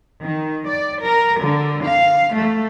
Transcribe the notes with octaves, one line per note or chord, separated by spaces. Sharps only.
D#3
D5
A#4
D3
F5
A3